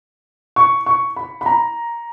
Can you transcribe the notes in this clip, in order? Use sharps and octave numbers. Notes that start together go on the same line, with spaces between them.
C#6
C#6
B5
B5
A#5